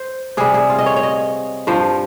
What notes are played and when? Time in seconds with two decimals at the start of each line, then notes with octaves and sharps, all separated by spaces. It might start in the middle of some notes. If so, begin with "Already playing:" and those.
Already playing: C5
0.37 C3 G3 G#4
0.54 G#4
0.70 F4
0.79 D#5
0.86 C#5
0.96 C#5
1.03 D#5
1.67 G2 F3 C5